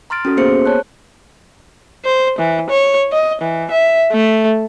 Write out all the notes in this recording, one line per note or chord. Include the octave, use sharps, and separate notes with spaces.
A#5 C6 F6 A6 D7
C#4 F#4 A4
A#3 B3 G#4 C5 C6 C#7
C#5 A5 F#6
C5
E3
C#5
D#5
E3
E5
A3